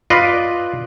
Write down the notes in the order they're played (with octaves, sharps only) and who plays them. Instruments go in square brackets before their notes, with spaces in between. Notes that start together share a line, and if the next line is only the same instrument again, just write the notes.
[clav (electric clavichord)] F4 B4 D5 D#5